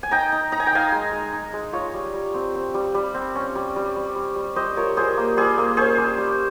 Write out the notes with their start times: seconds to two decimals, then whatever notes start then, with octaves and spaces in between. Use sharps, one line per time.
0.03 G#5
0.11 D#4 G5 A#5
0.32 D#4
0.52 D#4 A#5
0.60 G#5
0.67 G5
0.73 D#4 F5 G#5
0.92 G#3
1.12 G#3
1.33 D#4
1.53 G#3
1.73 F4 C#5 F5
1.94 G3
2.14 G3
2.34 C4
2.55 C4
2.74 G3
2.94 G3
3.14 C4
3.35 C#4
3.55 G3
3.76 G3
3.96 G3
4.16 G3
4.36 G3
4.56 G3 C5 D#5
4.77 F4 A#4 C#5
4.97 G3 G#4 C5
5.17 A#3
5.37 G3 G#4 C5
5.58 A#3
5.77 C#4 G#4 C5
5.98 G3
6.18 G3